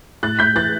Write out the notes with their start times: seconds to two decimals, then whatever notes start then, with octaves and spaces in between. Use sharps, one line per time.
0.23 A2 F#6 A6
0.39 A2 G6 B6
0.55 E3 F#6 A6